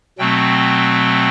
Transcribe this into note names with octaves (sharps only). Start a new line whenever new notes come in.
B2 F#3 A3 C4 G5